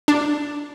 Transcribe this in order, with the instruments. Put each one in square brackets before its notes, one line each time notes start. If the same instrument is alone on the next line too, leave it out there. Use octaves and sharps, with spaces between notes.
[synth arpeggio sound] D4